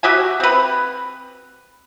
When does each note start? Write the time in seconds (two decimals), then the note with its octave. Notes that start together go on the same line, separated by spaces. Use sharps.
0.03 F#4 G4 E5 G#5
0.40 C4 B4